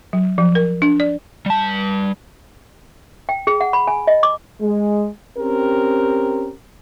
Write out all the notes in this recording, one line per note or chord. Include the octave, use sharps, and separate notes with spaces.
F#3
F3
A#4
D4
D5
G3 A5
G5
G#4
F#5
B5
G#5
D#5
D6
G#3
C4 C#4 G4 A#4